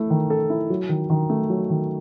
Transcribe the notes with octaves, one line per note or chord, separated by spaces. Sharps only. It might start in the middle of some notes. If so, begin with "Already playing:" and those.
Already playing: A3 E4
D#3
A4
E4
F#3
D#3
D#3
A3
F#3
D#3